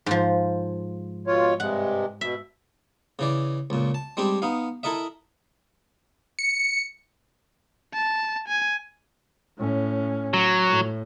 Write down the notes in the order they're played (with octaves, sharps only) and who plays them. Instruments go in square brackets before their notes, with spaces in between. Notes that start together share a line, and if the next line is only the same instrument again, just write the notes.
[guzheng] G#2 F3
[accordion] B2 F4 C#5
[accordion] G2 C3 G#3 [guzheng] F#5
[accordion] B2 [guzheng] E5
[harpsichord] C#3 E3 D5
C#2 A#2
A5
G3 G#3 C4 D4 G4
B3 D#4 F5
E4 A4 A#4 D#5 E5
[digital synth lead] C#7
[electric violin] A5
G#5
[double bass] A2 C#4
[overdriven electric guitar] F#3
[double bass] A2